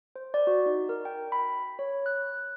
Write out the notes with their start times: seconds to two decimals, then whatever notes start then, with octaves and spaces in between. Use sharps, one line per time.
0.16 C5
0.34 D5
0.47 F#4
0.66 D#4
0.89 A#4
1.05 G5
1.32 B5
1.79 C#5
2.06 F#6